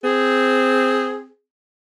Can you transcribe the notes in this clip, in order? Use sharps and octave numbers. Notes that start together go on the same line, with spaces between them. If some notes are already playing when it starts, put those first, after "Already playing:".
C4 G#4